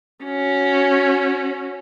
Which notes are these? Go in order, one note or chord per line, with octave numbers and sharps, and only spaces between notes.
C#4 F#4